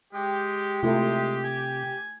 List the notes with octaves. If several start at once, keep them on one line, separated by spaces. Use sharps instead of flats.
G#3 G4
C3 G#3 A3 E4 F4
G#5